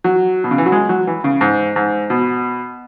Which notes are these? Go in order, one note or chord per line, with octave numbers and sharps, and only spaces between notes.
F#3
B2
C#3
E3
F#3
G#3
F#3
E3
C#3
G#2
G#2
B2